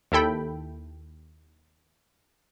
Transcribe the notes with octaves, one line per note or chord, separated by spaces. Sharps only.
D#2 E4 A4 G5 B5